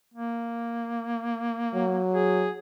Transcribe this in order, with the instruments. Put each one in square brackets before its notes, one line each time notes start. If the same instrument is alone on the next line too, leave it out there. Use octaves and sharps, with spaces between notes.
[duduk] A#3
[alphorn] F#3
[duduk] G#4